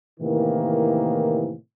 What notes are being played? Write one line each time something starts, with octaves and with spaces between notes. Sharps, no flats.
A2 C3 D#3 E3 A#3